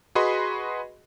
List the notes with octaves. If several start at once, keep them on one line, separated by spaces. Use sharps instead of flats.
F#4 G#4 B4 D#5 B5 C6